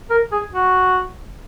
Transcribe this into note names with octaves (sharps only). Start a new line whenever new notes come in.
A#4
G#4
F#4